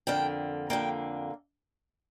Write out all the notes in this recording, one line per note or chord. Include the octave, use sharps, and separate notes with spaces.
F2 D3 A#3 G5
F2 D3 A#3 G5